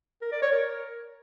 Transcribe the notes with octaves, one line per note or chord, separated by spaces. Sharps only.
A#4
D5
C#5
A#4